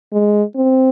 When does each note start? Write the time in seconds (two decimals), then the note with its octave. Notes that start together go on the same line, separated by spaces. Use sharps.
0.13 G#3
0.56 C4